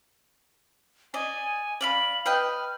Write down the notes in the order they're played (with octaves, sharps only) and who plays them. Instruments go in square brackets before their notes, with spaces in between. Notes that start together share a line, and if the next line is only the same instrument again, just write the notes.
[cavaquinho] D5 D#5 [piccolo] G#5
[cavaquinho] D5 F5 B5 [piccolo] F#7
[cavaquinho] B4 D#5 G5 [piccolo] F6